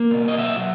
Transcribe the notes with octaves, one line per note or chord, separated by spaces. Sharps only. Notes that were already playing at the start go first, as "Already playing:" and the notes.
Already playing: A#3
B2
D#5
F#3 E5